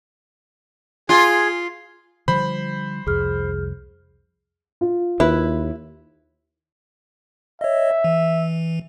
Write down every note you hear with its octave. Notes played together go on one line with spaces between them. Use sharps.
F4 G#4
D3 F3 G3 C5 B5
C2 F2 G#4 F6
F4
D#2 E4 B4
C#5 D#5 E5
E3